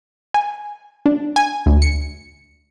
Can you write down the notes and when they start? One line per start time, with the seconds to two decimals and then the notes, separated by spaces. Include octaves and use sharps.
0.34 G#5
1.06 D4
1.36 G#5
1.66 D2
1.82 C#7